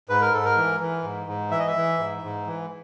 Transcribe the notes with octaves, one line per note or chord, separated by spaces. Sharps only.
G#2 B4
A#4
G#2 A4
A#4
E3
E3
G#2
G#2
E3 E5
D#5
E5
E3
G#2
G#2
E3